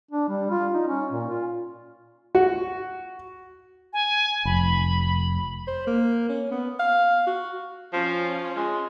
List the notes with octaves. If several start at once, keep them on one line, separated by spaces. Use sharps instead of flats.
D4
G3
F4
D#4
C#4
A#2
F4
F#4
G#5
F1 B5
C5
A#3
C#4
B3
F5
F#4
F3 C#4 F4
G#3